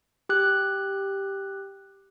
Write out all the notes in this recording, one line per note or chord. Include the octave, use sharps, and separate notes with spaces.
G4 F#6